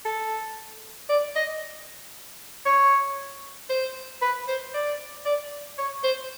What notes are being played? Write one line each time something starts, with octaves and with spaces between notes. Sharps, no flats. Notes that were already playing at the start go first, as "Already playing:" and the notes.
A4
D5
D#5
C#5
C5
B4
C5
D5
D5
C#5
C5